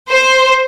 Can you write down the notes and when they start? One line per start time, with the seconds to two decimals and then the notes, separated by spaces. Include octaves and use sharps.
0.11 C5